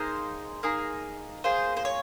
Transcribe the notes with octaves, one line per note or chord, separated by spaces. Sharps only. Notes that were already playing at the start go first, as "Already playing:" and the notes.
Already playing: A#3 D#4 G#4 C5
A#3 D#4 G#4
A#3 F4 G#4 C5
C5
C#5